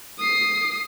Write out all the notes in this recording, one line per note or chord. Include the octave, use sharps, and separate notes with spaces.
D#6 C7